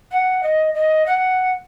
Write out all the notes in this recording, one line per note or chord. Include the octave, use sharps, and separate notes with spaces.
F#5
D#5
D#5
F#5